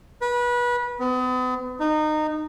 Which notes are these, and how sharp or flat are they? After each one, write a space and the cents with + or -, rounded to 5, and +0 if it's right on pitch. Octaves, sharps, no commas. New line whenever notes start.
B4 -25
B3 +40
D#4 -20